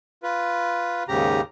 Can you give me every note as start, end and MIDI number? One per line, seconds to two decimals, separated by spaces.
0.23 1.03 65
0.23 1.03 71
1.08 1.41 39
1.08 1.41 44
1.08 1.41 49
1.08 1.41 67
1.08 1.41 82